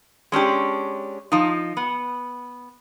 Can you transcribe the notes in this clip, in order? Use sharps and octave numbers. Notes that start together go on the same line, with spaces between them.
G#3 C#4 D4 G4
F3 D#4
B3